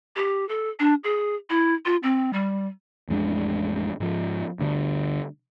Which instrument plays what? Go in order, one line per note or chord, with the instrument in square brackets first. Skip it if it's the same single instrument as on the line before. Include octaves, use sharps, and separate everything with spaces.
[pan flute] G4
A4
D4
G#4
E4
F4
C4
G3
[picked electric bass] A1 F2 G#3 D4
G#2 F3
D2 G2 D3